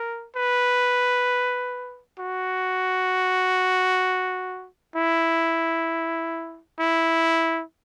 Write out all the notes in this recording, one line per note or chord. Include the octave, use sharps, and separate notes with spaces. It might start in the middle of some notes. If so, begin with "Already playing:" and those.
Already playing: A#4
B4
F#4
E4
E4